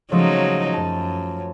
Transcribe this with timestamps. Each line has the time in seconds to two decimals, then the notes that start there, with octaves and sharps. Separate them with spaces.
0.12 C#3 F3 F#3 G#3 A3 D#4
0.74 F#2 A5